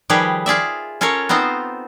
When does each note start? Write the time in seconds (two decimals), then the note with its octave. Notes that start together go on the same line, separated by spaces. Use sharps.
0.10 D#3 F3 G3 G4 G#4 B4
0.46 F4 G#4 D5 E5
1.01 C#4 F4 A4 A#4 C#5
1.29 B3 C4 D#4 F4 C5